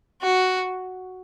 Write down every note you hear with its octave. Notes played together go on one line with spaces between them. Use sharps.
F#4